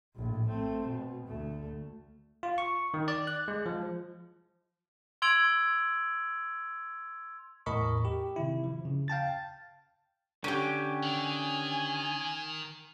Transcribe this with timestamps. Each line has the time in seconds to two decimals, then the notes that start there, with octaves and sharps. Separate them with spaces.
0.15 A#1 A2
0.48 A3 C4
0.87 B2
1.27 D2 A3
2.43 F4
2.58 C#6
2.94 D#3
3.08 D5
3.27 F#6
3.48 G#3
3.66 F3
5.22 C6 E6 G#6 D7 F7 F#7
7.66 E2 A2 A#4 D#5 B5 C#6
8.05 G4
8.36 C3 D#3 E4
8.64 F3
8.85 C#3
9.08 F5 G5 A5 A6
10.44 D3 C#4 G4
11.03 D#3 G#5